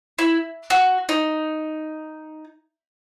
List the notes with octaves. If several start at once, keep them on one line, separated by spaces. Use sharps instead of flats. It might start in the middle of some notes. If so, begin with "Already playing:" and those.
E4
F#4
D#4